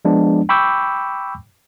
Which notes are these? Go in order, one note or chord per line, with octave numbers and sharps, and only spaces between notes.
F3 G#3 B3 D4
G5 B5 C#6 D6 E6 G6